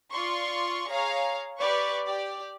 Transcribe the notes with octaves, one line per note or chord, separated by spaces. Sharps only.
F4 D5 C6 C#6
G#4 C#5 F5 A#5
G4 B4 D5 C#6
G4 D5